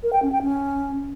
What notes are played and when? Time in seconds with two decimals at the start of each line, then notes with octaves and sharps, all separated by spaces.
0.03 A#4
0.13 G5
0.22 C#4
0.32 G5
0.42 C#4